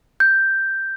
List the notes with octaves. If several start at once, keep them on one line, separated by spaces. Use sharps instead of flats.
G6